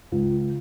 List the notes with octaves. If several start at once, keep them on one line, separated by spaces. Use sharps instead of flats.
C#2